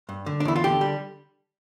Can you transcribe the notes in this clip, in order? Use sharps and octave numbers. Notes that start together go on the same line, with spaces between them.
G2
D3
D4
E2 E4
F4
D3 G4
G3